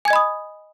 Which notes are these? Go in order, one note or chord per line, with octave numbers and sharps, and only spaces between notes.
D#5 G#5 B5 D#6 G#6